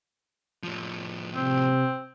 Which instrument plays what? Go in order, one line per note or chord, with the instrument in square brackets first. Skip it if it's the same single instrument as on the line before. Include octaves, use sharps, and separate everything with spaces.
[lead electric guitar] A2 F3
[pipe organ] C3 [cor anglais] C4